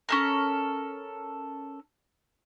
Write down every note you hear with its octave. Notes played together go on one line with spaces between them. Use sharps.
C#4 A4 A#4